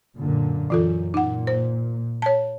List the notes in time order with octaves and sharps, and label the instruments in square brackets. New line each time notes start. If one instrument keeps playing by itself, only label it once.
[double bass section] F#2 A#2 D3
[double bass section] F#2 [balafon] E3 F4 A4
[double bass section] A#2 [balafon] D#4 F#5
[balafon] C5
C#5 A5